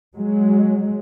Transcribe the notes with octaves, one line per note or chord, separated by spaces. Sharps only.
F#3 G#3